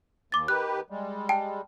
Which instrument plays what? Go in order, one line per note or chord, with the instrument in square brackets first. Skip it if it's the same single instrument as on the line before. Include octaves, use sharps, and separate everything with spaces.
[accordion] D#2 [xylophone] D6 A6
[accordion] D#3 G4 B4 [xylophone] F#6
[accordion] G3 G#3
[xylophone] G5 A5